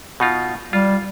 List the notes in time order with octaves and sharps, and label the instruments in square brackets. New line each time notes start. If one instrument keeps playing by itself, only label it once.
[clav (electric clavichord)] B2 D#4 F4
[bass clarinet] G3 [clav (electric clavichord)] F4